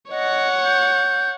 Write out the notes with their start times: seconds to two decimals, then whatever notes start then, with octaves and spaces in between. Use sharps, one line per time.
0.11 C#5 D#5 F#5
0.65 G6